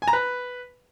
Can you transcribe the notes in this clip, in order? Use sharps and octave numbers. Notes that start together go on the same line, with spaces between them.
G#5
A#5
B4